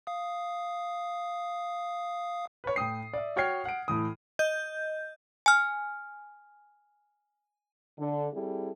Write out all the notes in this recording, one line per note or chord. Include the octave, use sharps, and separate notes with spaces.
F5 D#6
B4 C#5
A2 G5 D#6 C7
D5 E5
F#4 C#5 G5 F6 G#6 C7
F#5 D7
A2 E3 D#6
D#5 G6
G#5 F6
D3
G3 C4 E4 G#4 A4